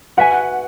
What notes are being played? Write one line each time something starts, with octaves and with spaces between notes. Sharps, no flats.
F#4 B4 E5 F#5 G#5